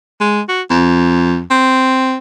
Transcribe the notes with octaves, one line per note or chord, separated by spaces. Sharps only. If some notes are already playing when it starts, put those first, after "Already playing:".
G#3
F#4
F2
C4